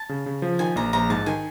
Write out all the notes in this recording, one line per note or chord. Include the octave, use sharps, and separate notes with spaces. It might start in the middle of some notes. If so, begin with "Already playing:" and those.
Already playing: A5
C#3
C#3
F3
D#3 G#5
A#1 A#5
A#1 A#5
G#2 A5
D#3 G#5